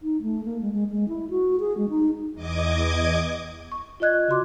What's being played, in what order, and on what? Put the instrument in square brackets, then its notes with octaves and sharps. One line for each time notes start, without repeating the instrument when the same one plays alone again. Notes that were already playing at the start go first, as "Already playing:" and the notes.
[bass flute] D#4
A3
A#3
G#3
G#3
G#3
E4
F#4
G#4
G#3
D#4
[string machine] E2 D#5 D6 D#6 G#6
[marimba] C#6
F4 D5 D#5 F#6 G#6
C#3 F#4 C6 D6